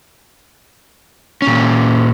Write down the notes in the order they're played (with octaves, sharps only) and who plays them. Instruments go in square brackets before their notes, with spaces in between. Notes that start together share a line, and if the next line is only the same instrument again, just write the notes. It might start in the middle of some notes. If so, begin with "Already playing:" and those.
[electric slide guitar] A#2 C#4